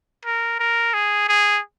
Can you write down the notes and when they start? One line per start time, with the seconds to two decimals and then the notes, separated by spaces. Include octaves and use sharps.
0.25 A#4
0.60 A#4
0.94 G#4
1.29 G#4